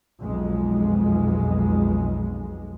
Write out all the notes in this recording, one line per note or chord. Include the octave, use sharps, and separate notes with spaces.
B1 F2 G#3